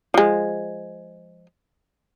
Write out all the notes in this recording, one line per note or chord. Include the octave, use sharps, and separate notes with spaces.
F3 G#3